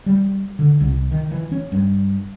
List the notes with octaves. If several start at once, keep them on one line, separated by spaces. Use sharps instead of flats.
G3
D3
C2
D#3
E3
C#4
G2